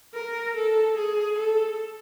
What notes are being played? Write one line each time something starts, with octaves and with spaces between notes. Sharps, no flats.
A#4
A4
G#4
A4